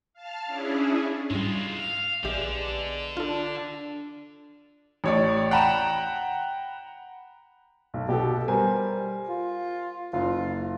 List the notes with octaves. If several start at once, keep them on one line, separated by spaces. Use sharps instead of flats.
F5 A5 F6
C#4 D4 E4 G#4
G#2 G3 G#3 F4
F5
A#1 D3 G#3 B3 G4 D5 E5
D4 F4 A4
A1 C#5 D5
F#5 G5 A#5 B5 E7
B1
B2 F#4 G4 A4
G3 A#4 C5 G#5
F4
F#1 F4